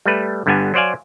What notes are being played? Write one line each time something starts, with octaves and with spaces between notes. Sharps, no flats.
G3 A3 B4
G1 G2 D3 G3 B3 G#5
F#3 C5 D5 F5 G#5